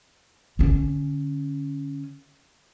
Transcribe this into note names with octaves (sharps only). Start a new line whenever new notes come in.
D3 C#4